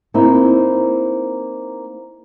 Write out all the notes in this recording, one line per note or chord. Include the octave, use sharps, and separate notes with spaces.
A#3 C4 D#4 E4